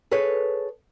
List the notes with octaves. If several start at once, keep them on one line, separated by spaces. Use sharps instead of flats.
G#4 A4 B4 C#5